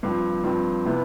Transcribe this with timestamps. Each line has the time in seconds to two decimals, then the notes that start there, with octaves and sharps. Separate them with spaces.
0.03 G2 F3 C4
0.44 G2 F3 C4
0.85 C3 E3 B3